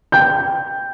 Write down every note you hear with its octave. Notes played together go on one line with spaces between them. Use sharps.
G5 G6